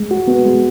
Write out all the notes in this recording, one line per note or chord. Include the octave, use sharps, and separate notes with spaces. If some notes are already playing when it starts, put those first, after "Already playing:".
Already playing: G#3
F#4
B3
G#3